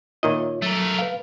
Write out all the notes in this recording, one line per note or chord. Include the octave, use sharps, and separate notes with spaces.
A#2 D#3 F4 C#5 D#5 E5
F#3 A3 A#4
B4 F5